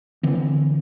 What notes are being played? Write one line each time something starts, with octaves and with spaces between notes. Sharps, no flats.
D3 E3 C4